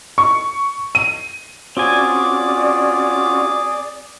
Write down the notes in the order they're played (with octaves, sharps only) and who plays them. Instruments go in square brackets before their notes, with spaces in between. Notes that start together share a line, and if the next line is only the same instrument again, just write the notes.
[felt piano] C#6
D#7
[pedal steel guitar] C4 G#5 [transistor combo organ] C#4 F4 F#4 [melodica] G#4 D6 [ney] D5